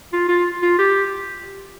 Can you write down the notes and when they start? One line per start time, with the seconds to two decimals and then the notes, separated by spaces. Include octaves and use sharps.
0.13 F4
0.28 F4
0.62 F4
0.79 G4